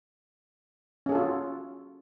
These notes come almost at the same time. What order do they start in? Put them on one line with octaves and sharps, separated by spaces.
C#4 G#4 A4 F4 F#4